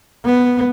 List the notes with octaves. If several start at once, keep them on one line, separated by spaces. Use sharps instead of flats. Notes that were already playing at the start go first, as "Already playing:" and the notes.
B3